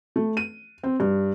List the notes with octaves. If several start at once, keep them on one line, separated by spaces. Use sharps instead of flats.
A3
D#7
C4
G2